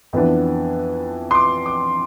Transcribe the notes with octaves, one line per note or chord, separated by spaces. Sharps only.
F2 E3 B3 D4
C6
D6
D6